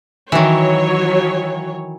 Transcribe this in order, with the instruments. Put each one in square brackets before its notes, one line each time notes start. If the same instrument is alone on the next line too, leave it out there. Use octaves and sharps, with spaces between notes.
[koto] D#3 E3 [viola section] F#3 C#5